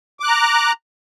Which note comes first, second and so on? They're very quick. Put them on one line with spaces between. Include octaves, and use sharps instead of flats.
D6 F#6 A#5